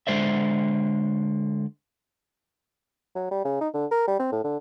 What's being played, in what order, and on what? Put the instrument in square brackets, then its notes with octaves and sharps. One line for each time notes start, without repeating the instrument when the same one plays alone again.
[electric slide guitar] D3 G#3 C5 D5 E5
[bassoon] F#3
G3
C#3
D#4
D3
A#4
G3
C4
A2
D3